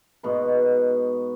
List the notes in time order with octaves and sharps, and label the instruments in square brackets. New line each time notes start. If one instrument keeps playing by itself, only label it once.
[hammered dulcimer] G#2 B2 B4